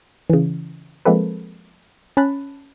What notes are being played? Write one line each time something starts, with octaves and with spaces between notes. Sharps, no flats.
C#3 E3
F3 G#3 A#3 C4 A4 B4
C#4 A5 B5 F#6